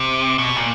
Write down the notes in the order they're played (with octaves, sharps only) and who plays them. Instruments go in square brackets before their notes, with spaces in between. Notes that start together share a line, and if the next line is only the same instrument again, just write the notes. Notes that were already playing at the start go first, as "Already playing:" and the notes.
Already playing: [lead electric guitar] C3
B2
A#2